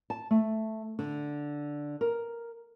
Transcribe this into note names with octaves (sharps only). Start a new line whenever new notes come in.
A5
A3
D3
A#4